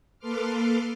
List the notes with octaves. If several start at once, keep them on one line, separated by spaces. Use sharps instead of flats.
A#3 A4 B4 C6 D6 F6